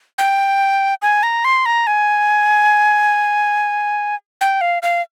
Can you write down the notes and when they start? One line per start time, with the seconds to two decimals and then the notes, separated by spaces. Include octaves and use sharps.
0.18 G5
1.02 G#5
1.23 A#5
1.45 C6
1.66 A#5
1.87 G#5
4.41 G5
4.61 F5
4.83 F5